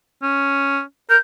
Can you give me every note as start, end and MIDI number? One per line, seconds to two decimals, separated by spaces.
0.23 0.81 61
1.10 1.17 70
1.10 1.18 91